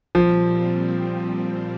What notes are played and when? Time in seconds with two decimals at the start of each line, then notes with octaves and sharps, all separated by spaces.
0.15 A#2 F3 G3 C4